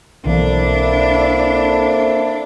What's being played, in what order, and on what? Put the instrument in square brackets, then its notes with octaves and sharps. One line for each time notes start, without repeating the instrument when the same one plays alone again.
[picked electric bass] B1 E3 [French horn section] A#3 C4 A4 [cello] D4 [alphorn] E4